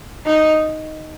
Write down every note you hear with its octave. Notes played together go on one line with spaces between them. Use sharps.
D#4